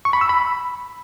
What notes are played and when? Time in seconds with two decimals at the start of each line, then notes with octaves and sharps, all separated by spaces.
0.05 C#6
0.13 B5
0.21 E6
0.29 B5